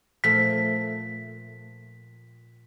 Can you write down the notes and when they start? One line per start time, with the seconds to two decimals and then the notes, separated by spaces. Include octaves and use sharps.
0.24 A#2 F3 A3 B6